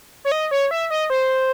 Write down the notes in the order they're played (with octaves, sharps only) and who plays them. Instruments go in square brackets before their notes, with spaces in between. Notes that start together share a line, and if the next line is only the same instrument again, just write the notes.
[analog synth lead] C#5
D#5
C#5
E5
D#5
C5